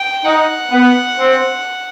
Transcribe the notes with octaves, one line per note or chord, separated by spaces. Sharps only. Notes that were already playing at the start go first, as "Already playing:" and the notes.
Already playing: G5
D#4 F#5
B3
C4